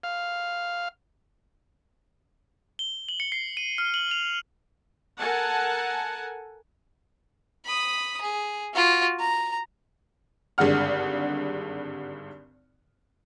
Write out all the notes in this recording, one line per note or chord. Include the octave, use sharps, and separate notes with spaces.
F5
G7
F#7
C#7
C7
D#7
F6
F#7
F7
A4 A#4 F#5 G#5 A5
B5 D#6
G#4
F4 F#4
A#5
G#1 G2 D3 G#3 F#5 F6